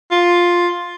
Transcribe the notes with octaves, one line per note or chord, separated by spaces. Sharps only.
F4